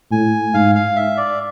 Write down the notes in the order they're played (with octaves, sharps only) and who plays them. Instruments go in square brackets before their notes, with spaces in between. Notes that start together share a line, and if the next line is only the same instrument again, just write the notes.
[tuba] A2 [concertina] G#5
[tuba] G#2 [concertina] F5
[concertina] F5
E5
D5